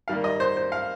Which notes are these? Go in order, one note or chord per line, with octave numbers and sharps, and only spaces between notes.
D#3 G3 A#3 F5
D#5
C5
C5
F5